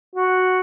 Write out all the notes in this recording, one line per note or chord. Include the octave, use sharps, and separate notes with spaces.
F#4